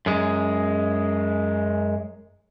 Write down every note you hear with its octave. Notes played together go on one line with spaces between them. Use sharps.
F#2 G#3